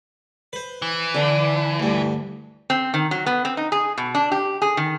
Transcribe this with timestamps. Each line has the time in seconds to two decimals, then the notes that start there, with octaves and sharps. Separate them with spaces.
0.53 B4 C5
0.82 E3
1.14 D3 D4 C6
1.80 D2 G2
2.70 C4
2.94 D#3
3.11 F#3
3.26 B3
3.45 C4
3.57 D#4
3.72 G#4
3.98 B2
4.15 D4
4.32 G4
4.62 G#4
4.77 D#3